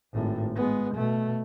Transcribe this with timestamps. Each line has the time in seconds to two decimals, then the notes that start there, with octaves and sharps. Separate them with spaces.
0.13 G#1 A2
0.56 G#3 B3
0.94 B2 A3